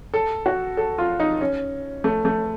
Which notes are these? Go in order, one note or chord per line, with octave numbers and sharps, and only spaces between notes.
A4
F#4
A4
F4
D#4
C#4
A3
A3